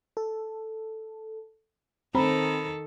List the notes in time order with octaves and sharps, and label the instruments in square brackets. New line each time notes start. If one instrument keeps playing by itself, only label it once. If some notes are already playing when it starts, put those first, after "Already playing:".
[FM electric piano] A4
[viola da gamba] D#3 A4 [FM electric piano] C4 [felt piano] C5 A#5 B5